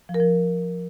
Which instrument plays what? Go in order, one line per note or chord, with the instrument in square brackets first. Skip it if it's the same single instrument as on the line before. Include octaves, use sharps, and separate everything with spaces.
[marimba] F3
A#4
F3